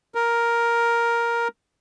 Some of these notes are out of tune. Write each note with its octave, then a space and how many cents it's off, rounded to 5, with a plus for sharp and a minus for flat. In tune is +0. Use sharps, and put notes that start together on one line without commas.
A#4 +5